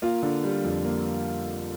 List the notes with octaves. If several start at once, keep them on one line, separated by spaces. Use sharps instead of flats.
A#3 F4
D3
G3
F2
A#3